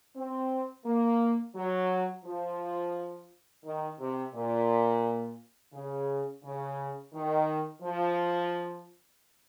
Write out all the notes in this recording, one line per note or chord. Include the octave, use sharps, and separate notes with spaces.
C4
A#3
F#3
F3
D#3
C3
A#2
C#3
C#3
D#3
F3